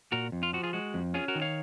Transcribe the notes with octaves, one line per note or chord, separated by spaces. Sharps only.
A#2 F#4 A#4
F2
F4
F3 F#4
F4 G#4
G#3 F#4
F2
C#4 F4 G#4
F#4 A#4
D#3
C#5 F5